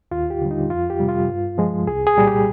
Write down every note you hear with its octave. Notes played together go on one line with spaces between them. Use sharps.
D#2 F4
G4
D3 G3
D#4
F2 F4
G4
C3 G3
F4
G2
F3 G#3
C2 G#4
G#4
A#2 G3
G4